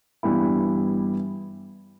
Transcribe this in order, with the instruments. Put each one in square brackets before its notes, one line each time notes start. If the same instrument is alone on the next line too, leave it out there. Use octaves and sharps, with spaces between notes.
[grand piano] G2 E3 G3 B3 E4